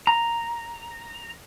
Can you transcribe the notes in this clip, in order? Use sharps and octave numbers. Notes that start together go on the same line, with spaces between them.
A#5